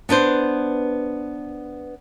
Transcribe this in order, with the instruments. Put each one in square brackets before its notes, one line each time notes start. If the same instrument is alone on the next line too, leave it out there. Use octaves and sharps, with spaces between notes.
[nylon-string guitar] B3 D4 B4 C5